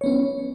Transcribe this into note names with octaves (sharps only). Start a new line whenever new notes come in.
B3 C#4 C#5